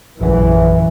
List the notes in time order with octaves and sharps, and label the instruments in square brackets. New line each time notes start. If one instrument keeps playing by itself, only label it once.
[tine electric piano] A#1 F#2 [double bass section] E3